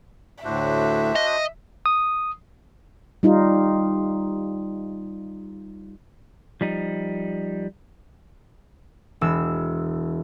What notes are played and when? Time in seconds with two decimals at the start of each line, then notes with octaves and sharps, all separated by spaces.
0.44 D2 A2 D4 F#4 C5 E5
1.15 D#5
1.86 D#6
3.23 G3 D#4 F4
6.61 F3 G3 D#4
9.21 E1 E6